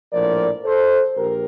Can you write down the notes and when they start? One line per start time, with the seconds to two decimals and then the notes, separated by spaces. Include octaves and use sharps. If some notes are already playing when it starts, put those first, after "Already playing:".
0.13 A#1 A2 F3 A#4 D5
0.64 A4 C5
1.16 A#1 G4 A#4